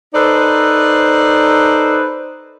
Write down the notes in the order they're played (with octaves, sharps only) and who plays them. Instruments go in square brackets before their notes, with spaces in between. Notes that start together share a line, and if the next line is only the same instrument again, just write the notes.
[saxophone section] D#4 A4 B4 C5 D5